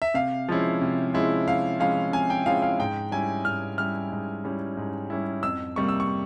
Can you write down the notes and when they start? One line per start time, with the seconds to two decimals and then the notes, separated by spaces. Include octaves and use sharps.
0.02 E5
0.14 C3 F5
0.49 F3 G#3 C#4 E4
0.82 C3
1.14 F3 G#3 C#4 E4
1.47 C3 F5
1.80 F3 G#3 C#4 E4 F5
2.13 C3 G#5
2.30 G5
2.46 F3 G#3 C#4 E4 F5
2.62 F5
2.79 G#2 G5
3.12 G3 C#4 E4 G#5
3.45 G#2 F6
3.78 G3 C#4 E4 F6
4.12 G#2
4.44 G3 C#4 E4
4.77 G#2
5.10 G3 C#4 E4
5.43 F2 E6
5.76 C3 G3 A#3 C#6
5.88 E6
6.00 C#6